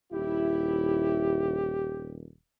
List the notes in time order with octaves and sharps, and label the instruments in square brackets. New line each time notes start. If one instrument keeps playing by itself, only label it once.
[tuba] D#1 [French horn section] E4 [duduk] G4